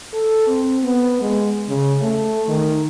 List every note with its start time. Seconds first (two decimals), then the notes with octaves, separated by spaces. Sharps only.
0.14 A4
0.47 C4
0.84 B3
1.22 G#3
1.69 C#3
2.02 A3
2.49 D#3